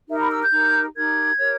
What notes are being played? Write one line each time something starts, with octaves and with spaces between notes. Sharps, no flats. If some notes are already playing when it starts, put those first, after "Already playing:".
D#4 G4 A#4 E5
B5
E6
G6
D#4 G4 A#4
D#4 G4 A#4 G#6
G4 A#4 C#5